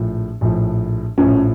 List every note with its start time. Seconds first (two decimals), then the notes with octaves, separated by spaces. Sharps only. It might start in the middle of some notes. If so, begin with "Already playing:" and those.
Already playing: A#1 A2 F3
0.41 A#1 A2 F3
1.18 A#1 A2 F3 C#4